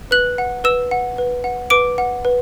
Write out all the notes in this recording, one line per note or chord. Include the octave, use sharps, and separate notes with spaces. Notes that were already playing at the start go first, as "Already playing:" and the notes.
B4 F#6 F#7
F#5
B4 E6 E7
F#5
B4
F#5
B4 D6 D7
F#5
B4